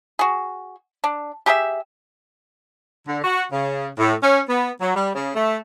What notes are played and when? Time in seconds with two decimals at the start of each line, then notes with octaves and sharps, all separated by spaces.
0.19 F#4 G#4
1.04 D4
1.46 G4 G#4 A#4 E5
3.08 D3
3.24 F#4
3.52 C#3
3.99 A2
4.23 C#4
4.49 B3
4.81 F#3
4.96 G3
5.15 C#3
5.35 A3